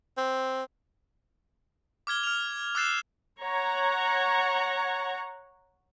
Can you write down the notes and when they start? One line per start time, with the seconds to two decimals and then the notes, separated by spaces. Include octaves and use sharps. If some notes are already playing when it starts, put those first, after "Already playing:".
0.17 C4
2.07 D6 F6 G#6 G7
2.23 F6 F7
2.75 D6 E6 F#6 A6 C7 E7
3.40 C#5 F#5 A#5